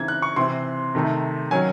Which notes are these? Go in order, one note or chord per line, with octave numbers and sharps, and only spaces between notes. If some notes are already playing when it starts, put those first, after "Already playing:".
Already playing: C#3 E3 C4 D#4 G#6
F#6
C#6
C3 E3 C4 C6
C3 D#3 A3 D#4
D#3 F#3 C#4 G#5